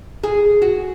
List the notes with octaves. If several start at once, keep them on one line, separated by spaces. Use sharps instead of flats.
G#4
F#4